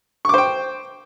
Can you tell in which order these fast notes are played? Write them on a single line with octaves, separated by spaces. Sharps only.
C#6 D6 C5 G5